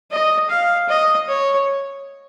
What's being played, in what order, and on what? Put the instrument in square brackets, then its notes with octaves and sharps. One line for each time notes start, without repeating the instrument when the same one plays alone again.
[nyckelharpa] D#5
F5
D#5
C#5